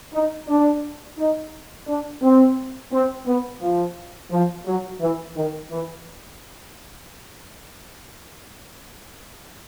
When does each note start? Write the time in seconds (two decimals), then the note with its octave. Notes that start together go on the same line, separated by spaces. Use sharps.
0.14 D#4
0.48 D4
1.19 D#4
1.88 D4
2.22 C4
2.92 C4
3.26 B3
3.62 F3
4.32 F3
4.66 F#3
5.00 E3
5.36 D#3
5.71 E3